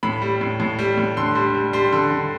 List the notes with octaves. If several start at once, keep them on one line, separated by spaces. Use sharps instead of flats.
A2 B5
G3
A2
A2
G3
A2
D3 C6
G3
G3
G3 C6
D3
D3